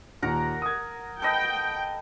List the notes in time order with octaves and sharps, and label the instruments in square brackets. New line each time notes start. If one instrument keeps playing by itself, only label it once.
[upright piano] D#2 A#2 [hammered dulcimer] A#4 F#5 A#5
[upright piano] D#6 G#6
[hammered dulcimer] A4 B4 D#5 [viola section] G5